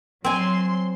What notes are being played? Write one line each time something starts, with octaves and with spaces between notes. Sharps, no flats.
F#3 C4 G#5 C6